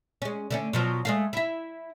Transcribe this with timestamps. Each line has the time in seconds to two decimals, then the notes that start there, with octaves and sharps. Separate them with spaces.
0.22 G#3 C#4
0.50 D3 A3 C#4
0.73 B2 F3 F#3
1.05 G#3 A3 F5
1.33 E4 E5